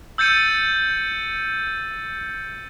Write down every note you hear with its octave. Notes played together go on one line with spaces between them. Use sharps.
E6 G6 A6 C#7 D#7